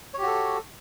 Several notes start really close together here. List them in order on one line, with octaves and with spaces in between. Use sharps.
C#5 G4 F#4 A4